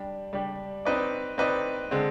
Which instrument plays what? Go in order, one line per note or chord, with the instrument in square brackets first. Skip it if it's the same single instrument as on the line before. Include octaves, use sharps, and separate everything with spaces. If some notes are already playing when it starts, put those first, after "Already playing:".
Already playing: [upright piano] G3 D4 G4
G3 D4 G4
C4 D#4 B4 D5
C4 D#4 B4 D5
D3 G#3 C4